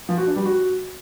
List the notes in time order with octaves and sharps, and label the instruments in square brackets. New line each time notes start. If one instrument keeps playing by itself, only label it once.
[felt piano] F3
F#4
D4
G3
F#4